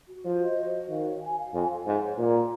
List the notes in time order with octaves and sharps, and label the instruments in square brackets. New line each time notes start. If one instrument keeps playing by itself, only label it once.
[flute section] F#4
[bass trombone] F3 [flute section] C5
[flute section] D#5
F#4
F#4
[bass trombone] D#3 [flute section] F5
[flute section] C#5
G#5
F5
[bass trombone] F2 [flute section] G#5
[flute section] F5
[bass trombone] G#2 [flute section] G#5
[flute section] C#5
[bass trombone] A#2 [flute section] A#5
[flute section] A#4